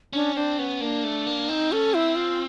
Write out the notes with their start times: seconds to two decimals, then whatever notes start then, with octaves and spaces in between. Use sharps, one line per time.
0.13 C#4 D4
0.36 C4 D4
0.59 B3 C#4
0.81 A#3 D4
1.04 A3
1.27 A#3
1.49 C4 D#4
1.72 C#4 A4
1.93 C4 E4
2.16 F4